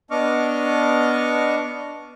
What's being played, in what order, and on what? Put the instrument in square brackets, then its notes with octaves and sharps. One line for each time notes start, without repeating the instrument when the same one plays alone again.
[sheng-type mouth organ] B3 D4 D#5 C#6 D6 F6